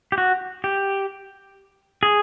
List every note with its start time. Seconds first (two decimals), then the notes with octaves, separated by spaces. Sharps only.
0.12 G4
0.18 F#4
0.64 G4
2.03 G#4